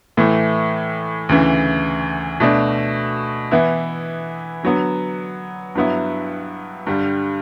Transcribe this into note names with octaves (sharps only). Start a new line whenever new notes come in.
A2 E3 A3
D2 C#3 E3
B2 A3 D4
E3 B3 E4
D3 F#3 B3
G2 F#3 B3 E4
G2 D3 G3